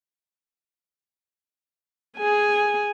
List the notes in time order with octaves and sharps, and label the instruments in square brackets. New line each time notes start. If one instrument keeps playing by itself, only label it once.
[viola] G#4 G#5